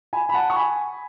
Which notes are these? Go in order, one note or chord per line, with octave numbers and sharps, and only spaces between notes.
G#5 B5
B5
F#5 A5
C#6
G#5 B5